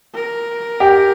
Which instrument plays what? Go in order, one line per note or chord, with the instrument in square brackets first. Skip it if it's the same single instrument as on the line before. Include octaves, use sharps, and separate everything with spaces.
[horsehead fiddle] A#4
[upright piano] G4